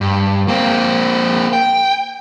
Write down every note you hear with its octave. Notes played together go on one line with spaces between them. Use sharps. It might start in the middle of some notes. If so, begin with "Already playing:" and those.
G2
A#3 C4
G5